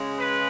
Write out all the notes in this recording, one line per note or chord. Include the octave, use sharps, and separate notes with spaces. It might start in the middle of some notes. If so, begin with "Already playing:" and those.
Already playing: C#3 G#3
B4